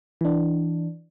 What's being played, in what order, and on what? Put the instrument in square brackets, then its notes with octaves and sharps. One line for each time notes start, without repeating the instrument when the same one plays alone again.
[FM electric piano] E3 D4